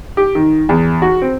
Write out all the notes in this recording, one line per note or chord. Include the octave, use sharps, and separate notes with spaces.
G4
D#3
E2
F#4
C4